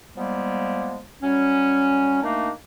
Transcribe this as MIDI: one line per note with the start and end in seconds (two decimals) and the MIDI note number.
0.17 0.98 53
0.17 0.98 55
0.17 0.98 56
0.17 0.98 58
0.17 0.98 59
1.22 2.21 54
1.22 2.21 55
1.22 2.21 61
2.22 2.49 51
2.22 2.49 57
2.22 2.49 58
2.22 2.49 62
2.22 2.49 63